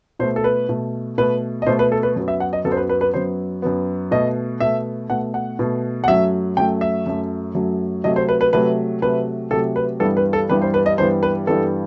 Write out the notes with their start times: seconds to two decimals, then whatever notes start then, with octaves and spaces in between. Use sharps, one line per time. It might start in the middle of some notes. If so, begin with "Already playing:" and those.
0.19 B2 C5
0.23 A3
0.36 A4
0.44 B4
0.69 B2 A3
1.18 B2 A3 B4
1.62 D#5
1.66 B2 A3 C5
1.79 B4
1.92 A4
2.03 B4
2.16 F#2 F#3 B3
2.28 E5
2.40 F#5
2.53 D#5
2.65 F#2 F#3 B3 A4
2.72 C5
2.77 B4
2.89 B4
3.01 B4
3.14 F#2 F#3 B3 C5
3.62 F#2 F#3 B3
4.11 B2 A3 D#5
4.60 B2 A3 E5
5.10 B2 A3 F#5
5.34 F#5
5.59 B2 A3
6.04 F#5
6.08 F#2 F#3 A3 E5
6.57 F#2 F#3 A3 G5
6.81 E5
7.06 F#2 F#3 A3
7.55 F#2 F#3 A3
8.04 C3 F#3 A3 D#5
8.16 C5
8.29 B4
8.41 B4
8.53 C3 F#3 A3 B4
9.02 C3 F#3 A3 B4
9.51 C3 F#3 A3 A4
9.76 B4
10.00 G2 E3 G3 B3 A4
10.17 B4
10.33 A4
10.49 G2 E3 G3 B3 B4
10.62 C5
10.74 B4
10.86 D#5
10.98 G2 E3 G3 B3 C5
11.23 B4
11.47 G2 E3 G3 B3 A4